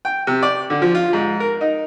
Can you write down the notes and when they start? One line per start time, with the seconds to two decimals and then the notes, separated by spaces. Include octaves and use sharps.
0.05 G5
0.27 C3
0.42 D5
0.70 D3
0.82 F3
0.95 F4
1.13 G#2
1.40 A#4
1.61 D#4